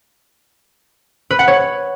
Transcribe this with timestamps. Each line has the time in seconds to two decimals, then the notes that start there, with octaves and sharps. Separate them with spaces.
1.31 B4
1.39 F#5
1.48 C#5